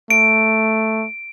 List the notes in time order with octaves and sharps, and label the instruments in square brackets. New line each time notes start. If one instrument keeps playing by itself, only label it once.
[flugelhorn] A3 [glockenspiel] D7